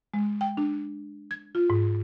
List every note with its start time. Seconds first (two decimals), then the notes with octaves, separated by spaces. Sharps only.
0.14 G#3
0.41 G5
0.57 D4
1.31 G#6
1.55 F4
1.70 G#2